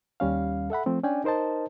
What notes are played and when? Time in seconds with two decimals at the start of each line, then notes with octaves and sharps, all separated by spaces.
0.20 D#2 G3 C#4 F5
0.70 A4 E5 F#5 B5
0.86 F3 A3 C4
1.03 C#4 D4 D5 G5 G#5
1.24 D#4 A#4 C5 D#5 A5